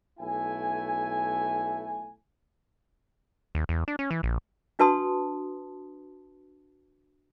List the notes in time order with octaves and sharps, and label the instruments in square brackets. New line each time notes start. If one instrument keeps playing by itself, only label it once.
[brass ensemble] B1 A3 E4 G#5
[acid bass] D#2
E2
D4
C#4
E3
A#1
[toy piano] D4 F#4 B4 A5 C6 D#6